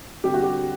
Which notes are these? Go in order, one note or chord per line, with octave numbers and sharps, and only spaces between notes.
D3 G3 C4 G4
F#4
G4